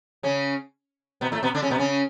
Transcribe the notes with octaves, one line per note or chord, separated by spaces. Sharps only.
C#3 C#4
B2 B3
A2 A3
B2 B3
D3 D4
C#3 C#4
B2 B3
C#3 C#4